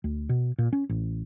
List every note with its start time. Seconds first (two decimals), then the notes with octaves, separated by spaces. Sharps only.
0.04 D2
0.29 B2
0.58 A#2
0.73 C#4
0.89 A1